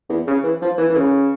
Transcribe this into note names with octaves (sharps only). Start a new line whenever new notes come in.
E2
C#3
E3
F3
E3
E3
C#3